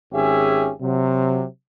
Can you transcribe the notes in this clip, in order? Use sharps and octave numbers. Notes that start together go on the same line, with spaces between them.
G#1 C#4 G4 G#4 E5 G#5
C3 F#3